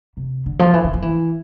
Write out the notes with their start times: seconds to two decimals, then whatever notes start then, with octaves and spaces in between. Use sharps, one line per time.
0.17 C3
0.46 D3
0.59 F3
0.74 E3
0.84 D3
0.93 F3
1.02 E3